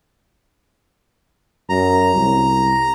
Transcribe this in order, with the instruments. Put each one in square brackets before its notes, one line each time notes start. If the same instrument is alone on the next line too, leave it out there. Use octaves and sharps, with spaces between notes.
[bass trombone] F#2 [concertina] A#5
[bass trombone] C2